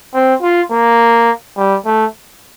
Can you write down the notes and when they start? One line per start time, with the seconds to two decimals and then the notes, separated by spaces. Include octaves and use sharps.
0.14 C4
0.42 F4
0.71 A#3
1.57 G3
1.85 A3